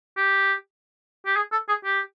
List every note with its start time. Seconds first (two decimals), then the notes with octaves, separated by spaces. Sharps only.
0.17 G4
1.26 G4
1.36 G#4
1.52 A4
1.69 G#4
1.85 G4